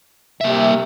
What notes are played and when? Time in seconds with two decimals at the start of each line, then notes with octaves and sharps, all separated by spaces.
0.41 C3 A#3 E5